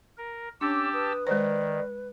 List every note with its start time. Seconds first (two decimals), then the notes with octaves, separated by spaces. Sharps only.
0.17 A#4
0.61 C#4 D4 G4 A5 D6 E6
0.93 B4 D#6
1.27 D#3 G#3 C5 D5